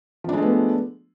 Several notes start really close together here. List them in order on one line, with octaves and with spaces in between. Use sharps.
F3 D4 G#3 A3 B3